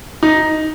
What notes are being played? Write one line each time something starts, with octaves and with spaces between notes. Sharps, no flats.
D#4